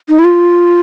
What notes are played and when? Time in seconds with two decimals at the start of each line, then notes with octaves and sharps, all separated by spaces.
0.09 D#4
0.19 E4
0.24 F4